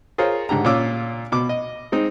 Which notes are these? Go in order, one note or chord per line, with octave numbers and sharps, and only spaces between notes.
F4 G#4 A#4 C5 C#5
G#2 D3 G4 A#5
A#2 C#4 F4 D6 E6
B2 D6
D#5
G#3 C4 D#4